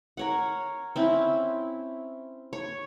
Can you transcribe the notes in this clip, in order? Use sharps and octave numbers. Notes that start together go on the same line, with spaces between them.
A#4 C#5 F#5
C4 C#4 E4
C#5